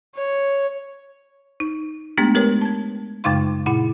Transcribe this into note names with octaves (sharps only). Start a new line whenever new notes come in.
C#5
D#4
G#3 A3 B3 D4 G4
G#3 G4 A#4 B4 C#5
A5 G#6
F#2 C#3 G#3 D#4 F5 C6
A#2 E4 F#5